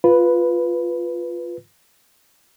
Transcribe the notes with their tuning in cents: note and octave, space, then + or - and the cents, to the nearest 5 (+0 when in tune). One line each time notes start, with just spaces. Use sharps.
F4 +0 B4 +0